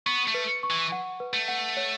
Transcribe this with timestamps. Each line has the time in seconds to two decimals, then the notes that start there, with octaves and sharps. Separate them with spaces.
0.06 B3 C#6
0.27 A3
0.34 B4
0.63 C#6
0.70 E3
0.92 F#5
1.20 B4
1.33 A3
1.48 F#5
1.77 C#5